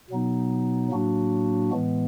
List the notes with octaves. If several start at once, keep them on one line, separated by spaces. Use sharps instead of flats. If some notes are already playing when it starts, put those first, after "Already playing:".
B2 F#3 B3 D#4
A2 F#3 A#3 D4 F#4
A2 E3 G#3 B3